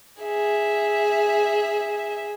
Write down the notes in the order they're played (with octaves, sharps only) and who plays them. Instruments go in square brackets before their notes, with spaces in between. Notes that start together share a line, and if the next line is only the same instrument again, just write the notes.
[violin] G#4 E5